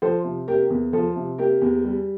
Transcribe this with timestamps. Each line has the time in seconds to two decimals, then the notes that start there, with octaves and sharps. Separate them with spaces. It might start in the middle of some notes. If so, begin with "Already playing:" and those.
0.02 F3 A4 C5
0.24 C3
0.47 A#3 G4 A#4
0.70 E2
0.93 F3 A4
1.16 C3
1.38 A#3 G4 A#4
1.61 E2
1.85 G3